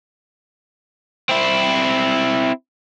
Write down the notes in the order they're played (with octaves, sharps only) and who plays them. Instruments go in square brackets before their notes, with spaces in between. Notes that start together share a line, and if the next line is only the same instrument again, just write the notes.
[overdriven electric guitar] C4 E4